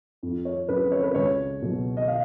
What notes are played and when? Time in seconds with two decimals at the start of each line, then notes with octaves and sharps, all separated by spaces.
0.23 F2
0.45 C#5
0.69 C#3 F#3 B4
0.92 C#5
1.03 B4
1.15 C#2 C#5
1.62 B2 F#3
1.97 D#5
2.08 F5